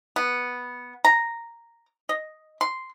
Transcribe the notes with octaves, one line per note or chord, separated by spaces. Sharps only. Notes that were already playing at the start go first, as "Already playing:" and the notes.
B3
A#5
D#5
C6